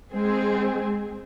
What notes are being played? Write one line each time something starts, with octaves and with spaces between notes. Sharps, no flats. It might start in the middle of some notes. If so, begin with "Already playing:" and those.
G#3 C4 G#4